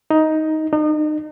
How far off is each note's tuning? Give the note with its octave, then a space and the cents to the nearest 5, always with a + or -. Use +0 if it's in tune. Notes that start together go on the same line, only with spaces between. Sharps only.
D#4 +10
D#4 -35